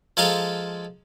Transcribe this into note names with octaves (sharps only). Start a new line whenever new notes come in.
F3 G#3 A4 F5 A#5 C6